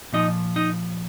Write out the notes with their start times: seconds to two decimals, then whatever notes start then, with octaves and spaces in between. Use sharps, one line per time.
0.13 A#2 F3 D#4 D#5
0.56 D#4 D#5